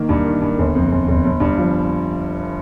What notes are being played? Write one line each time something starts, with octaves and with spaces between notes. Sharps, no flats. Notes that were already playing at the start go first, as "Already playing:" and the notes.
Already playing: D#3 A#3
G2
D#3
G2
G1
F2
G1
G1
G1
G2
F3